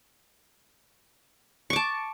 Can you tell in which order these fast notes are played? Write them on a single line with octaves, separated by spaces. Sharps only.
C#6 D6 A5